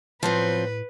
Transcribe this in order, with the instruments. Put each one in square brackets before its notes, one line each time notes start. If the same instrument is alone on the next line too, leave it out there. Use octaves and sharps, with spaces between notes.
[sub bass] A2 [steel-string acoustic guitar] F3 F#3 C4 [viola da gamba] B4